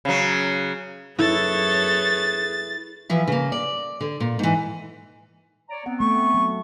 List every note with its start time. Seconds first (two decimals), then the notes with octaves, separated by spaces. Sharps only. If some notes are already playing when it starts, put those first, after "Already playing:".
0.05 C#3 F#3
1.19 F#2 E4 G#4 A4 B4 C#5 A6
3.09 E3 F3 E5
3.27 C#3 A#3
3.52 D5
4.01 D3
4.20 A#2
4.39 G#2 E3
5.70 C#5 D5 A#5
5.86 B3 C4 F#5
6.00 A3 C#6
6.34 F#3